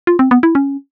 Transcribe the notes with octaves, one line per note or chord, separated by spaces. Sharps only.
F4
C4
B3
E4
C#4